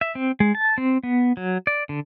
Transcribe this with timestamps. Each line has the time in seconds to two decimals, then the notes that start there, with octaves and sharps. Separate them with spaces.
0.01 E5
0.15 C4
0.40 G#3
0.55 A5
0.78 C4
1.03 B3
1.37 F#3
1.67 D5
1.89 D3